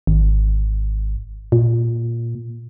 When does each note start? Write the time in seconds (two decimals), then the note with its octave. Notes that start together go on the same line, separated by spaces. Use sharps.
0.07 G#1
1.52 A#2